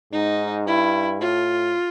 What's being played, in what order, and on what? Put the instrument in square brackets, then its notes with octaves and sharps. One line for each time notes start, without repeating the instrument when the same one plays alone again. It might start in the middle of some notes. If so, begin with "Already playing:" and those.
[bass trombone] G#2 [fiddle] D#4
[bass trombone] G2 [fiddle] E4
[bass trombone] A2 [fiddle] F4